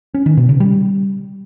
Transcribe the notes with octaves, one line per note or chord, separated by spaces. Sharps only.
C#4
D#3
B2
C#3
G3